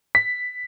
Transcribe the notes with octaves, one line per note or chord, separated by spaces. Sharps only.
B6